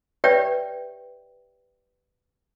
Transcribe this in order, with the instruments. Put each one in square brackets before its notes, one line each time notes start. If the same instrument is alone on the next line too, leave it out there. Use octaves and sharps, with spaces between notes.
[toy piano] G4 B4 C#5 D5 E5 G5